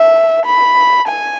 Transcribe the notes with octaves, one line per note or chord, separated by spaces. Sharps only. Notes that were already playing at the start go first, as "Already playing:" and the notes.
Already playing: E5
B5
G#5